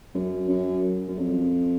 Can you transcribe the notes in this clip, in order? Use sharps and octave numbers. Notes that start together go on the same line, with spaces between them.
F#2
F#2
F#2
F2